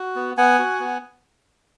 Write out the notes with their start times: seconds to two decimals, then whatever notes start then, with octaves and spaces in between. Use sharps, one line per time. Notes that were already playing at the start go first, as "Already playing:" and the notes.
Already playing: F#4
0.16 B3
0.37 B3 F#5 G#5
0.59 F#4
0.80 B3